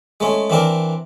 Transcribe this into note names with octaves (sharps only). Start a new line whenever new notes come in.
G#3 A3 C#4
E3 C4 D4 A#4